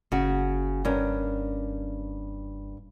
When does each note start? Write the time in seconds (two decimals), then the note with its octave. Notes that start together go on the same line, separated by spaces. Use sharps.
0.12 F#1 C#3 F#4
0.85 G2 C#4 A#4